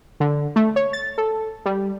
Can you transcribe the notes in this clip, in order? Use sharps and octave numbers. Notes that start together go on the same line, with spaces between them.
D3
A3
C#5
A6
A4
G3